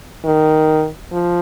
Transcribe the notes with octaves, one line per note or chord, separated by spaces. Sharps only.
D#3
F3